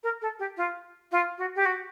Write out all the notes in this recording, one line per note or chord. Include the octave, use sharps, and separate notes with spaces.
A#4
A4
G4
F4
F4
F#4
G4
F#4